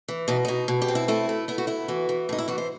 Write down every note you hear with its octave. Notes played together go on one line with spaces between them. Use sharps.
E3
B2 D#4
B2 D#4
B2
G4
C4
E4
A3 E4
A3
B3 E4
F#4
B3 E4
E3 F#4
E3
A2 D#4
E4
E3 F#4
C5